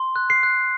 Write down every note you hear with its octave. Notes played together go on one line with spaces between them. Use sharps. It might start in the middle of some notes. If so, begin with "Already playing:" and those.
Already playing: C6
F#6
C7
F#6